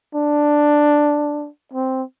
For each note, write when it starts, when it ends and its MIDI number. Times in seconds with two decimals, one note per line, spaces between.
0.15 1.49 62
1.73 2.03 60